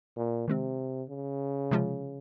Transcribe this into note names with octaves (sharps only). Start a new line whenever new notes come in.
A#2
C3 D#3 G#3 C4
C#3
C3 F3 G#3 C#4 F4